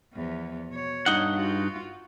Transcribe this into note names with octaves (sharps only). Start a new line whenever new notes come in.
E2 F3
B2 C#5
G2 D#4 F#5
F4 F#4